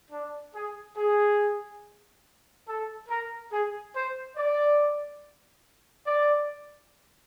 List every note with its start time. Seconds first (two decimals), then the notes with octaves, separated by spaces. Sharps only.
0.11 D4
0.54 G#4
0.96 G#4
2.67 A4
3.09 A#4
3.51 G#4
3.94 C5
4.36 D5
6.07 D5